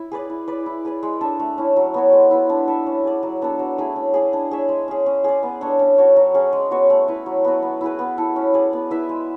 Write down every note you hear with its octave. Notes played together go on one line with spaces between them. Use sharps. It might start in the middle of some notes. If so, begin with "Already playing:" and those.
Already playing: E4
G#4 B4 D5
E4
B4 D5
E4
G#4 B4 D5
G#3
D4 A4 E5
A3
C#4 E4
F#3
B3 F#4 C#5
G#3
B3 E4
D4
A4 E5
C#4
G#4 D5
F#3
B3 D4 A4
F#3
A3 E4 G#4
C#4
G#4 D5
D4
G#4 C#5 E5
G#3
C#4 G#4
C#4
G#4 D5
B3
D4 A4 C#5
C#4
F#4 A4 C#5
F#3
C#4 G#4 C#5
G#3
B3 F#4 C#5
A3
E4 B4
F#3
B3 F#4
B3
E4 G#4 B4
B3
E4 A4
C#4
G#4 D5
B3
E4 B4 E5
G#3